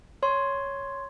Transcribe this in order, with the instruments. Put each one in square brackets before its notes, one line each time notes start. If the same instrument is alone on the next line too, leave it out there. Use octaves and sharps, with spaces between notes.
[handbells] C#5 C6